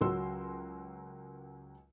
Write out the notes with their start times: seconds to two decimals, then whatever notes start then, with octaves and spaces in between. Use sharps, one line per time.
0.01 C#2 F#3 F#4 A#4 C6 E6